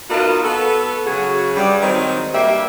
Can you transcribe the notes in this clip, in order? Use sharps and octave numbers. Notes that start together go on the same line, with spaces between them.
B3 D#4 F4 F#4 A#4
B3 F#4 A4
C#3 F#3 F#4 G#4
G2 G3
D#3 F#3 G#3 C4 D#4
G2 G3 A#3 E5